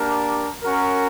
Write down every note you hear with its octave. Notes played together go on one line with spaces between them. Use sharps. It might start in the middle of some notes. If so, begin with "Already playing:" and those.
Already playing: A#3 D4 G4 A#4
C#4 F#4 A#4